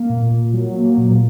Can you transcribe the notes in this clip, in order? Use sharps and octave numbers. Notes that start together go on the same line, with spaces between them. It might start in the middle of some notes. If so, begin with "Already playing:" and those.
Already playing: A#3
A#2
A#2
F#3
A#3
A#2